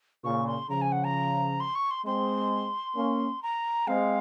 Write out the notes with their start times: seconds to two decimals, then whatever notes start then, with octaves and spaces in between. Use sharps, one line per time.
0.24 A#2 C#3 C#6
0.47 C6
0.70 C#3 F3 A#5
0.81 G#5
0.92 F#5
1.04 A#5
1.60 C6
1.75 C#6
1.91 C6
2.05 G#3 C4 C6
2.96 A#3 C#4
3.43 A#5
3.87 G#3 C4 F5